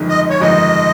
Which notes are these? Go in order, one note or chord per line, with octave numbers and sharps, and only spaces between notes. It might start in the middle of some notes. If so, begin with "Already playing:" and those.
Already playing: G1 F2 D#3 G#3 D#4
D#5
C#5
G1 F2 D#3 G#3 D#4 D#5